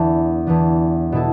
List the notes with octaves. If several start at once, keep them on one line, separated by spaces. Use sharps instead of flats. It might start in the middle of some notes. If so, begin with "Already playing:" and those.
Already playing: E2 E3 B3 D4
E2 E3 B3 D4
B2 B3 E4 A4